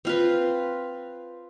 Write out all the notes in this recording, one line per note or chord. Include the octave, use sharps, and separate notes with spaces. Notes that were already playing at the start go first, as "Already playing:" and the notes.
C4 F4 B4